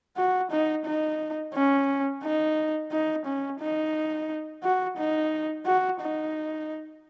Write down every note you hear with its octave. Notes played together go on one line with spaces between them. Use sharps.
F#4
D#4
D#4
C#4
D#4
D#4
C#4
D#4
F#4
D#4
F#4
D#4